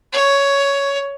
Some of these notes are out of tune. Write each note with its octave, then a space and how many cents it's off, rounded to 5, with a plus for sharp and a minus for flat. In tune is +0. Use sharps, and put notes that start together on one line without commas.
C#5 +10